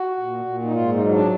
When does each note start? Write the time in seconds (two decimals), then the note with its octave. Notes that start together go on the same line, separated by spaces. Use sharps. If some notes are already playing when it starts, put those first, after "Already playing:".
Already playing: F#4
0.19 A#2
0.45 A#2
0.63 D#4
0.71 G#2 F4
0.92 D#4
0.98 F#3
1.06 D#4
1.11 D4